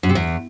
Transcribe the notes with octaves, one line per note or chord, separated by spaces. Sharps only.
F#2
C3
E2